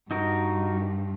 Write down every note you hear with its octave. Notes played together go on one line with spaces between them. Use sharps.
G2 D#4 F#4 A#4